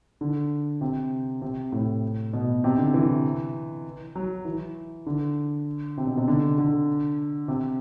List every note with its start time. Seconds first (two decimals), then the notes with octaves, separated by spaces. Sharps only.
0.21 D3
0.81 C3
1.42 C3
1.72 A2
2.33 B2
2.64 C3
2.78 D3
2.94 E3
4.15 F#3
4.45 E3
5.06 D3
5.97 C3
6.07 B2
6.17 C3
6.28 D3
6.58 D3
7.48 C3